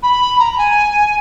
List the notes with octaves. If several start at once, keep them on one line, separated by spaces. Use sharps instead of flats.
B5
A#5
A#5
G#5